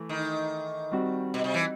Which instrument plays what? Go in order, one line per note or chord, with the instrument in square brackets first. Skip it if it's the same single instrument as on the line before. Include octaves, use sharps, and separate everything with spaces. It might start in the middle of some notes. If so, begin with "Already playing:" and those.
Already playing: [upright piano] E3 A3 E4
[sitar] D#3
[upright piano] G3 C4 F#4
[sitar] B2
C3
E3